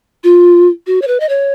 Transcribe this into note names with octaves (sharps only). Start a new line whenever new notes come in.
F4
F#4
C#5
B4
D#5
C#5